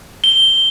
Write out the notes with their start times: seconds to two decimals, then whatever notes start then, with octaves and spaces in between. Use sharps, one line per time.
0.24 G7